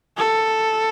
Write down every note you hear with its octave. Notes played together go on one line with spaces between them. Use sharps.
A4